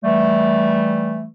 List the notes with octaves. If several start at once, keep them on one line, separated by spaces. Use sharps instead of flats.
E3 G3 A3